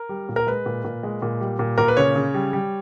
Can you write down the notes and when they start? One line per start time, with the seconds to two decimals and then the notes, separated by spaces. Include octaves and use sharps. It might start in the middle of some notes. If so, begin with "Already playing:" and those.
Already playing: A#4
0.09 G3
0.29 A#2
0.36 A#4
0.47 G#3 B4
0.66 A#2
0.84 A#2
1.03 G#3
1.22 A#2
1.41 G3
1.59 A#2
1.78 A#2 A#4
1.88 B4
1.97 C#3 C#5
2.16 C#3
2.34 G3
2.53 G3